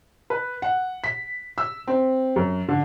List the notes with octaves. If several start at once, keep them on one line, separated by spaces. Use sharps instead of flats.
B4
F#5
B6
E6
C4
F#2
D3